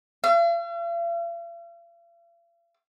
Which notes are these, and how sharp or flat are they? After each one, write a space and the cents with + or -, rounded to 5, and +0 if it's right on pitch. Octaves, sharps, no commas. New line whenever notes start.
F5 -45